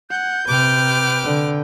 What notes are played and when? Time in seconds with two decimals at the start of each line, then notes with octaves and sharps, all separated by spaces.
0.10 F#5 G6
0.48 C3 B4 G5 D6 F6
1.24 D3